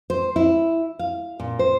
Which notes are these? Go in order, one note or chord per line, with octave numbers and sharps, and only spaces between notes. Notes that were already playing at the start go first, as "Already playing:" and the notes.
C5
E4
F5
A#2
C5